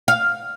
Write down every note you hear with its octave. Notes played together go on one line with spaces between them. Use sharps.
F5